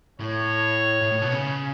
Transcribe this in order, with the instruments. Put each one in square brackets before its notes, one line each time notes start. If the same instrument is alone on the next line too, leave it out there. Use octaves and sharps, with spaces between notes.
[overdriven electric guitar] A2 [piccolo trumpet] C#5
[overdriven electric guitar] A2
A2
B2
C#3